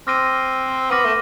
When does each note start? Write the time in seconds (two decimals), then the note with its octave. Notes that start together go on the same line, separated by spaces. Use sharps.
0.07 C4 D6 F6 A#6 D#7
0.90 B3 D6 F6 A#6 D#7
1.05 A3